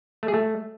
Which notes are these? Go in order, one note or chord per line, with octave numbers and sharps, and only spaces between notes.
A3
G#4
A3